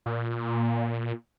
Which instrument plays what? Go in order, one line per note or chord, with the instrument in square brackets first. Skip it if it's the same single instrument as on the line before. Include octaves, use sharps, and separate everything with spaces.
[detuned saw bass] A#2